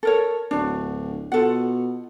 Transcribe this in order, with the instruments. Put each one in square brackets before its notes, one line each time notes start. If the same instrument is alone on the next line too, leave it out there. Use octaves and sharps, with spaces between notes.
[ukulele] A4 A#4 C#5
[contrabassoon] D1 [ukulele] D4 F#4
[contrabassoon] B2 [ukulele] F4 A4 F#5